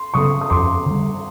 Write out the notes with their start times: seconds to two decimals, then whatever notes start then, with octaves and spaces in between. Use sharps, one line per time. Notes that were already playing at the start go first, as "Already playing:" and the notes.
Already playing: C6
0.14 C#3 F#3 B3 C#6 D#6
0.41 D#6
0.50 F2 C6 D6
0.86 D3 G3